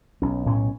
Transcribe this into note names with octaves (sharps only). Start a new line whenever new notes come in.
B1 C#4
A2 C#4